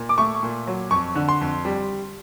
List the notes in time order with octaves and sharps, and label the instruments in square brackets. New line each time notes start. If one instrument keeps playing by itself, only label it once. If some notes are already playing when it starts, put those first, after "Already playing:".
Already playing: [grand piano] A#2
D6
A3 C#6
A#2
F#3
F2 C#6
D3
C6
F2
G3